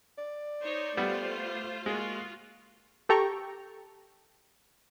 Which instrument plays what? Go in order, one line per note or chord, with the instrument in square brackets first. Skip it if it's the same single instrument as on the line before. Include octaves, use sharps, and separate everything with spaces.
[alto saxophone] D5
[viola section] D#4 C5 C#5
[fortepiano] G3 B3 [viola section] A3 F4 C5
[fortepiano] G#3 [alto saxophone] A#3 [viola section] F4 F#4
[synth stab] G4 A4 G5 A#5 C#6